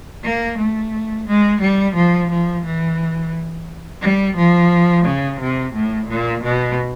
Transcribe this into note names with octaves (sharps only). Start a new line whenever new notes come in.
A#3
A3
G#3
G3
F3
F3
E3
G3
F3
C#3
C3
A2
A#2
B2